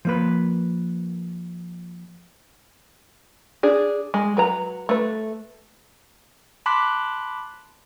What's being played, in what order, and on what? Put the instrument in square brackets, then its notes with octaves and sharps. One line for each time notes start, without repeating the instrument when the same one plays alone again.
[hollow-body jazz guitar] F3 A#3 B4
[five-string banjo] D4 G#4
G#3
F#3 B4 A#5
A3 B4
[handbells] A5 B5 C6 D6 F#6 B6